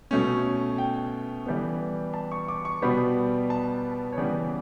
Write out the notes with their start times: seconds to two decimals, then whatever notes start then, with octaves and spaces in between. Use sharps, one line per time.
0.11 B2 A3 C#4
0.78 G5
1.46 E3 G3 B3
2.14 A5
2.32 C#6
2.48 D6
2.65 C#6
2.82 B2 G3 B3 B5
3.50 A5
4.13 C#5
4.17 C#3 E3 G3 B3 D5